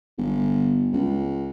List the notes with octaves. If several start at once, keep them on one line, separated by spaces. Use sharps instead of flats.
G1
C#2